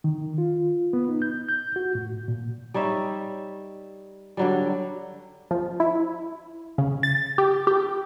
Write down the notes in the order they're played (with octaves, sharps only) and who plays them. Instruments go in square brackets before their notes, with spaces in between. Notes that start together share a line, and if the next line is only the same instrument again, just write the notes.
[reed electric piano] D#3
F4
B3
D#4
G6
G6
F#4
A2
A#2
[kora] G3 D#4 C#5 E5
D3 F#3 G3
[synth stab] F3
E4
C#3
A6
G4
G4